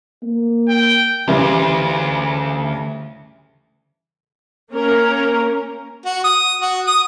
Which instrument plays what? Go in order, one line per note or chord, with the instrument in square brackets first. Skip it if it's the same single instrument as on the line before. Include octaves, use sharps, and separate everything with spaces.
[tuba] A#3
[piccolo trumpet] G5
[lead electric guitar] D2 [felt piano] C#3 E3 G3
[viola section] A#3 C#4 A#4
[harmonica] F#4
D#6
F#4
D#6